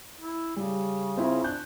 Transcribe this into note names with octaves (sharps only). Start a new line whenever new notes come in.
E4
C#3 G3
C4 E4 F4
D4 F#6 G6